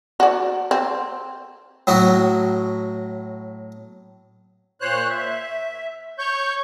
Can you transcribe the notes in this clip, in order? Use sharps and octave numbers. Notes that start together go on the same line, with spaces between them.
F#4 D5
C4
A2 F#3 D#4 F#4
A#2 C5 C#5 F#6
E5
C#5 C#6 G6